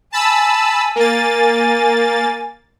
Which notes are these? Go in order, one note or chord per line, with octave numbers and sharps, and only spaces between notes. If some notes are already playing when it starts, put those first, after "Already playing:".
G#5 A5 B5 E6
A#3 A6